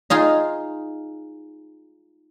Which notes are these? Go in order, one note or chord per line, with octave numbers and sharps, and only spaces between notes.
D#4 F4 G#4